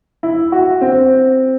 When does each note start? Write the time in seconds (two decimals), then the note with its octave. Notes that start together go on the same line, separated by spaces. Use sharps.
0.23 E4
0.52 F#4
0.81 C4